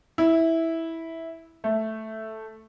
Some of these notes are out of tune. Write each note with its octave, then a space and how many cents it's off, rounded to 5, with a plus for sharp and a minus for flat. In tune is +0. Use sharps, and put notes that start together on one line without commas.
E4 -10
A3 +0